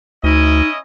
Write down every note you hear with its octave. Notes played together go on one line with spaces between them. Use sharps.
D2 C#4 D#4 E4 D#5